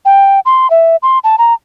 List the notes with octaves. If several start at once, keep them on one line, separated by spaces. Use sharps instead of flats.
G5
C6
E5
C6
A5
A#5